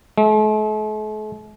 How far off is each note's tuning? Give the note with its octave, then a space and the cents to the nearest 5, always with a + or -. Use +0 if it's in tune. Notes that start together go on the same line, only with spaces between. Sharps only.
A3 -45